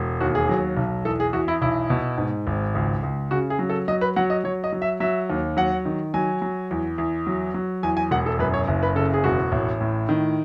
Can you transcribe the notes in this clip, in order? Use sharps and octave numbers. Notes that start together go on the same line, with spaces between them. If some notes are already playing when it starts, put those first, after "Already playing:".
Already playing: E1
D#2 F#4
G#4
F#3
B1
E2 A4
G#4
E2 F#4
E4
B1 E4
B2
G#2
G#1
C#2
C#2
C#3 F#4
G#4
F#3
A4
F#3 D#5
B4
F#3 F#5
D#5
F#3 C#5
D#5
F#3
E5
F#3 E5
D#2
F#3 F#5
D#3
F#3 G#5
F#3
E2
E2
F#3
F#3
E2 G#5
G#5
E1 F#5
A4
F#2 B4
C#5
F#1
B4
C#3 A4
G#4
E1 F#4
A1
A2
D#3